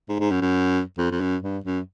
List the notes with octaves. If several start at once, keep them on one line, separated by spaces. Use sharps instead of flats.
G#2
G#2
F#2
F#2
F2
F2
F#2
G2
F#2